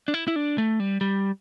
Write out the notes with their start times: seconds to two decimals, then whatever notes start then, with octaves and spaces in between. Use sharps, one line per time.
0.08 D4
0.14 E4
0.28 E4
0.36 D4
0.58 A3
0.80 G3
1.01 G3